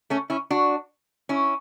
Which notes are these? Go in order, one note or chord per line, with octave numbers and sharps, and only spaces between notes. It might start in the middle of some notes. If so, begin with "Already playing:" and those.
A3 C#4
C#4 E4
D4 F#4
C#4 E4